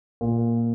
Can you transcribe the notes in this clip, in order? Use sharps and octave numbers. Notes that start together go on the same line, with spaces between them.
A#2